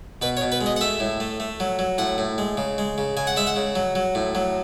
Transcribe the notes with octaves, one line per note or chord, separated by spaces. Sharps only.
B2 B4
C#5
B2
B4
G#3
D#5
F#5
A3 E5
A2
A3
A3
F#3
F#3
A2 F#5
A2
G#3
C#3
G#3
C#3
C#3 G#5
F#5
G#3 E5
F#5
C#3
F#3
F#3
A2
F#3